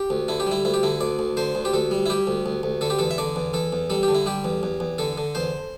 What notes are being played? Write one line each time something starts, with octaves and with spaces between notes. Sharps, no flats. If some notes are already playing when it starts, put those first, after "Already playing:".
Already playing: G4
D2
D3 E4
G4
G3 E4
D2 E4
G4
D3 E4
D2 D5
D2
D3 C5
D2
G4
D2 A4
G3
E4
G3 G4
D2
D2
D2
D3 A4
G4
E2 A4
E5
D3 D5
E2
E2 A4
E2
G3 A4
G4
D3
E4
G3 G4
E2
E2
E2
D3 A4
D3
E2 C5